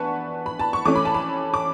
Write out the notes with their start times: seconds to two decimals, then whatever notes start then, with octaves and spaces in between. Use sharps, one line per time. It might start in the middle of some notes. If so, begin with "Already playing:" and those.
Already playing: E3 B3 D4 B4 F#5 A5 C#6
0.46 B5
0.59 A5
0.73 C#6
0.85 E3 A3 C#4 D6
0.96 B5
1.05 A5
1.15 B5
1.54 D6